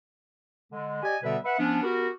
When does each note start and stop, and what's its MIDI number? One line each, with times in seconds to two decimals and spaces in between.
0.72 0.99 50
0.72 0.99 56
1.03 1.17 67
1.03 1.17 74
1.03 1.17 75
1.03 1.17 80
1.23 1.37 47
1.23 1.37 50
1.23 1.37 55
1.23 1.37 59
1.23 1.37 71
1.23 1.37 76
1.44 1.55 71
1.44 1.55 76
1.44 1.55 78
1.59 1.82 53
1.59 1.82 59
1.59 1.82 61
1.59 1.82 62
1.83 2.08 59
1.83 2.08 66
1.83 2.08 67
1.83 2.08 70